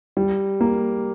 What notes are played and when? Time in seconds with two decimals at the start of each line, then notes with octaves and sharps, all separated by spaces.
0.17 G3
0.60 A#3